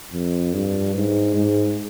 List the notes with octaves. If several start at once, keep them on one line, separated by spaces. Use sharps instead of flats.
F2
G2
G#2
G#2